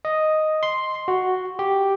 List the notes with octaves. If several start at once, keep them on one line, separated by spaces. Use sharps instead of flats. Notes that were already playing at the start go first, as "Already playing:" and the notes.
D#5
C6
F#4
G4